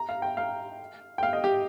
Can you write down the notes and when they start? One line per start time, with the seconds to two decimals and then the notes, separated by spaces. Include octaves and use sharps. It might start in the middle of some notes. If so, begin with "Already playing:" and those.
Already playing: A#5
0.09 F5
0.22 G5
0.37 F5
1.18 G5
1.23 F5
1.33 D#5
1.44 G4